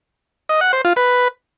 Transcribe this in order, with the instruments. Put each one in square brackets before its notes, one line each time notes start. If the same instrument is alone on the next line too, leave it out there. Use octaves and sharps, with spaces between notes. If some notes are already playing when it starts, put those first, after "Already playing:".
[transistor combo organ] D#5
F#5
C5
F4
B4